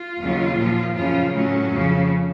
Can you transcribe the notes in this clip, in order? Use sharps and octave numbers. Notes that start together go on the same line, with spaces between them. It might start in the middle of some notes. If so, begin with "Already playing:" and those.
Already playing: F4
D#2 C#3 F#3
A#2 F3
F#2 C#3 F3 F4
A2 F#3 C#4
F2 C#3 F3